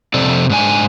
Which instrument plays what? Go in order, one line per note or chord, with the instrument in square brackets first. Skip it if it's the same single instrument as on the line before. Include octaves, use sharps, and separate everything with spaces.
[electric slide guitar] F2 C3 A4 D5
G#2 D4 G#5